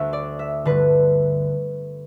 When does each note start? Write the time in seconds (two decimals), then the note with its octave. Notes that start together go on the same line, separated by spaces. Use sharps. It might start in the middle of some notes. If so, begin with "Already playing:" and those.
Already playing: D2 D3 E5
0.13 D5
0.39 E5
0.65 G2 D3 B4